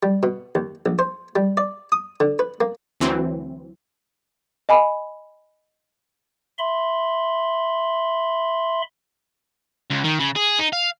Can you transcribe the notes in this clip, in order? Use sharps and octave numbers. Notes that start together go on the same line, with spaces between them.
G3
B2
D#2
A#1
C5
G3
D5
D#6
D3
B4
A#3
D2 E3 F#3 C4
D#5 G#5 B5
E5 B5 C6
C#2
D#3
C#3
G#4
D#4
F5